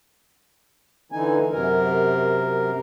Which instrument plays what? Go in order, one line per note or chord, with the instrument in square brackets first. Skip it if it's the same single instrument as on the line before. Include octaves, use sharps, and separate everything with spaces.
[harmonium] D3 E3 D#4 G#5
F#2 C3 A#4